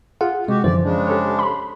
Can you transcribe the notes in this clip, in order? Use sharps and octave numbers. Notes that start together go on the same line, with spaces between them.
F4 G#4 F#5
C3 G#3 F#4 G4
F#2 D3 E3 F3 C5 D5
C#3 G#3 D4
G4 A4 C#5
B5 C6